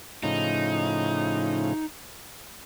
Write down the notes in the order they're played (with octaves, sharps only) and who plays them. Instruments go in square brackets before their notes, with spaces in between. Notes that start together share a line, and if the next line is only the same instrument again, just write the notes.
[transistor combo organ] A2 C#3 F3 [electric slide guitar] D#4